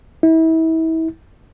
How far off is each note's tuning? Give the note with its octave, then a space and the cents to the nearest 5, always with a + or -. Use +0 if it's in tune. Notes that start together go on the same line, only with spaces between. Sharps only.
E4 -35